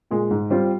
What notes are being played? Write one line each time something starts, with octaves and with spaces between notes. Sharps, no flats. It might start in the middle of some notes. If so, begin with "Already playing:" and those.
A#2 G#3
G#2
G3 C4 F4